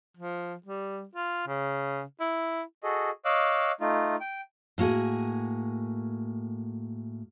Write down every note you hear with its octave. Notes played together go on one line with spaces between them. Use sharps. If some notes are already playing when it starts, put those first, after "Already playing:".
F3
G3
F4
C#3
E4
F#4 G#4 A4 D#5
C#5 D#5 F5 D6 E6 F#6
A3 D#4 F4
G5
A2 A#3 F#4 G#4 G#5